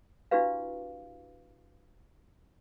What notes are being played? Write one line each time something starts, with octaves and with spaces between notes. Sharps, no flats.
D4 E4 F#4 G4 B4 F5